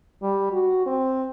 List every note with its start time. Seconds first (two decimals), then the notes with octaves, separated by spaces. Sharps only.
0.22 G3
0.53 F#4
0.86 C4